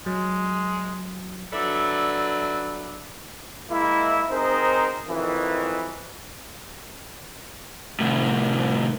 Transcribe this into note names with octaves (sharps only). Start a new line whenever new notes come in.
F#3 G#3
F#3 D4 A4 B4 D5 E5
G#3 A#3 E4
C4 D#4 G#4 A#4 C5
F2 D#3 E3
C2 A2